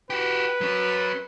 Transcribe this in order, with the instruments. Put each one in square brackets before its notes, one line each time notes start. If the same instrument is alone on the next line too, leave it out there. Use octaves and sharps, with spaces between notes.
[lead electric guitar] F#4 G4 [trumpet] B4
[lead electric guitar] F#3 C#4